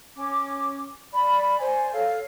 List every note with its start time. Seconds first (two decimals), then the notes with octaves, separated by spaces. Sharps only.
0.16 C#4 D6
1.13 D5 B5
1.59 C5 D5 G#5
1.92 A4 C#5 F5